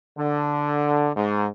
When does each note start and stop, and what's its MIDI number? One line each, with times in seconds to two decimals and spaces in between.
0.17 1.09 50
1.16 1.45 44